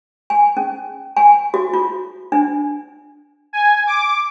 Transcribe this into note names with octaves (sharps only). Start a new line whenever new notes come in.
G#5
C#4
G#5
F#4
F4
D4
G#5
D6